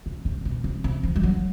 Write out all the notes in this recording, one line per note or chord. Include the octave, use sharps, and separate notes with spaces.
C3
C3
B2
C3
C3
F3
G3
F#3